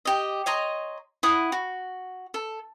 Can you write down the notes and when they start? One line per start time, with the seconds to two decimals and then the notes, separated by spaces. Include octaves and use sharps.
0.05 G4 D#5
0.46 C#5 D#5 A#5 C6
1.23 E4 F#5 D#6
1.52 F#4
2.34 A4